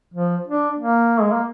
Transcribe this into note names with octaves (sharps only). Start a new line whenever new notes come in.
F3
D4
A#3
G#3
A#3